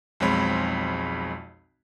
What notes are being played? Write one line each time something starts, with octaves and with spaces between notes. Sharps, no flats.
B1 F2 G#3 C4 C#5 B5